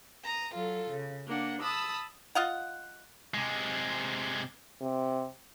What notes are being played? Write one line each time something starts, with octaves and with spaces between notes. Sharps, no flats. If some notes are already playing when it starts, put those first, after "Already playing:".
A#5 D#6
F#3 F4 A4
C#3
A#3 D4 F#5
A5 B5 D#6 E6
F4 D#5 F5 F#5
C3 G#3
C3